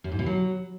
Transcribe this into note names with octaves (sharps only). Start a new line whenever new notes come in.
F#2
G#2
B2
F#3